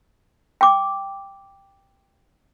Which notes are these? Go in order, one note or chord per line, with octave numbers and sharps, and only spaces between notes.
G5 D6